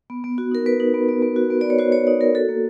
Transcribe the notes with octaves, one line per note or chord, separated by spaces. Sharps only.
B3
B3
F#4
D#4 A#4
B3 B4
D#4
B3
B3
B3
F#4
B3
B3 D5
C#5
F#4 C5
F#4 C#5
D#4 D5
F#4 A#4
F#4 A4
A#3